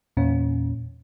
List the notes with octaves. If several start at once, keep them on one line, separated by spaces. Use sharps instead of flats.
E2 A#2 C#4